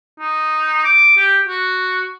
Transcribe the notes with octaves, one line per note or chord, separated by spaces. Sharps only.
D#4
D6
G4
F#4